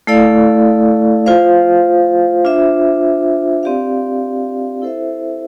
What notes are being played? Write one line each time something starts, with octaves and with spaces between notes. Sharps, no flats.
A3 E4 A4 D5 F5
F4 C5 F5
D4 F4 C5 E5
C4 G4 D5 F5
E4 A4 C5 E5